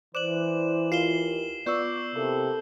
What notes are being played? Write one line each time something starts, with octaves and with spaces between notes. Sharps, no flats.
E3 C5 D5 D6 F#6 E7 F#7
D#2 F4 C7 E7 G7
B3 F4 D5 C#6 E6 G6
C3 A#3 E4 A4